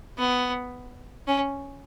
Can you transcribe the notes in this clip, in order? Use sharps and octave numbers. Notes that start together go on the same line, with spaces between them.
B3
C#4